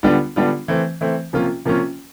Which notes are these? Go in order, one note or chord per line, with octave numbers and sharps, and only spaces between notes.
D3 G3 B3 D4 F4
D3 G3 B3 D4 F4
E3 A3 C4
E3 A3 C4
C3 F3 A#3 C#4 F4
C3 F3 A#3 C#4 F4